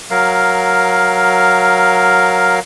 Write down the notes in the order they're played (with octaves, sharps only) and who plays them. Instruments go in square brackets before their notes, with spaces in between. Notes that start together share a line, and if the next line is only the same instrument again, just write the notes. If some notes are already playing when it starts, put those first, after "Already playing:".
[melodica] F#3 A#4 F5